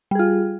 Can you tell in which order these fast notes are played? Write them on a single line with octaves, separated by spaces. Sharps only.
G3 G#4 F4